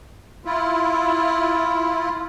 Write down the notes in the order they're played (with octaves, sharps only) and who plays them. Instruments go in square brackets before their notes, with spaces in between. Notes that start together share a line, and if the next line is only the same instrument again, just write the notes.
[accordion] E4 F4